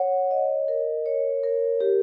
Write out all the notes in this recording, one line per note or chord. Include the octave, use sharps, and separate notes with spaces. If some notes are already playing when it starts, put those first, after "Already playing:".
Already playing: C#5 F#5
D#5
A#4
C#5
A#4
G4